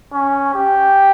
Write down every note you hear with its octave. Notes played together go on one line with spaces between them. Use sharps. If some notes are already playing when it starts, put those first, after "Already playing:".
C#4
G4